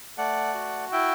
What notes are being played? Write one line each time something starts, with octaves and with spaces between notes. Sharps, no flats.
A3 D5 F#5
F#4
E4 E5 G5